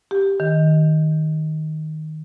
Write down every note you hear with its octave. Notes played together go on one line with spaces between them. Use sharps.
G4
D#3